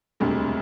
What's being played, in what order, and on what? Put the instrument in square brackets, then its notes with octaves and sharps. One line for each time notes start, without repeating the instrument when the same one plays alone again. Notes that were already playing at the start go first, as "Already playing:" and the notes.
[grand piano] E1 D2 C3 G3